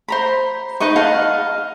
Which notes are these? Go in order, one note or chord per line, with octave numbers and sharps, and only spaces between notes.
C5 A#5 B5
D#4 B4 D#5 C#6
D#5 F5 F#5 A5